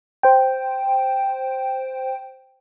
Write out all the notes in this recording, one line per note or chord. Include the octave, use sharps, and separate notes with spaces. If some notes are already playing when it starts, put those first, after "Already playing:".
C5 G5